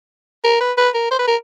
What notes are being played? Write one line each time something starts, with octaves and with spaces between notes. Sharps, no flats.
A#4
B4
B4
A#4
C5
B4
A#4